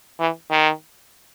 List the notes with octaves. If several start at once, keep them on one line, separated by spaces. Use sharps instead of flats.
E3
D#3